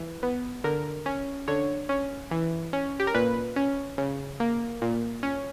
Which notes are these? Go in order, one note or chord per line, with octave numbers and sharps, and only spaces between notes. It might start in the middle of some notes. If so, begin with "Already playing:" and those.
Already playing: E3
B3
D3 A#4
C#4
D3 C#5
C#4
E3
C#4
G4
A#4
A#2 B4
C#4
C#3
A#3
A#2
C#4